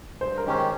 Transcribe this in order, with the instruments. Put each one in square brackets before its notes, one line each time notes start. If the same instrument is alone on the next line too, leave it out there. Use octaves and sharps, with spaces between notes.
[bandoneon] G2 [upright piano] C5
[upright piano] A#4
[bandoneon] D#3 G#3 C#4 G4
[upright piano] C5